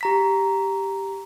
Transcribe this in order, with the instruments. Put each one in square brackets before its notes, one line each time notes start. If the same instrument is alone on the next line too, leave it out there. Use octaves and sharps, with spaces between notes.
[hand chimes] G4 A#5 B6